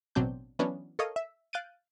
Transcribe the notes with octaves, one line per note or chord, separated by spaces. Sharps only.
A1 B2 F#3 C4 D4 G6
E3 F#3 B3 C#4 D4
A4 A#4 C#5 D#5 F5
E5
F5 F#6 G6 A6 D7 D#7